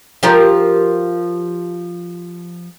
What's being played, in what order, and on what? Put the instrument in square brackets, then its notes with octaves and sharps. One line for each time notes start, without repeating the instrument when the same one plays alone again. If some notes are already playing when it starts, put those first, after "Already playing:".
[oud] F3 G4 A#4